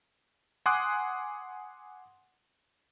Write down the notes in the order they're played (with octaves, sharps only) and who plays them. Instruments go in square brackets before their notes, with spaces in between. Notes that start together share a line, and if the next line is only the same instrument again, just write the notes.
[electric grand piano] F#5 G#5 C6 D6 D#6 F#6